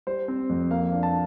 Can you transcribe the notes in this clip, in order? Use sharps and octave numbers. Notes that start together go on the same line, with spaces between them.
G3 C5
C4
F2
A#3 F5
D4
A5